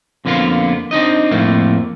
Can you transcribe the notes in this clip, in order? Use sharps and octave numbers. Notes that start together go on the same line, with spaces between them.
F2 D3 A#3 B3 F4
C4 D4 D#4 D#5
F2 A2 A3 A#3